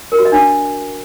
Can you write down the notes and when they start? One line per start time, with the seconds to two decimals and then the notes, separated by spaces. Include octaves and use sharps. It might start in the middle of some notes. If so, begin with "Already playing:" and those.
0.12 A#4
0.19 F#4
0.25 D#5
0.32 D4